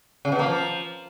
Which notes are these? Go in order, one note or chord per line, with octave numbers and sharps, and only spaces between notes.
C#3
B2
A#3
F3